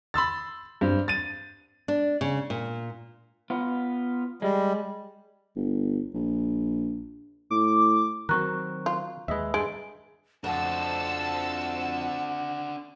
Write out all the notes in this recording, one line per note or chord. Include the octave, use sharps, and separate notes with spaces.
B5 C6 E6 A6
G2 C4
A6 D#7
D4
C#3
A#2
B3 F4
G3 G#3
G1
A#1
A2 D6
D#3 F#3 C4 F#4 A#4 C#6 F#6
F4
D#2 G#3 B4 D#5 E5
G2 G#3 D7
F2 D4 F#4 C5 F#5 A5 E6